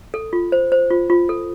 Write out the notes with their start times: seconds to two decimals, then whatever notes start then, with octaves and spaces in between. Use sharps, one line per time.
0.14 A4
0.33 F4
0.52 C5
0.72 C5
0.90 F4
1.10 F4
1.29 A4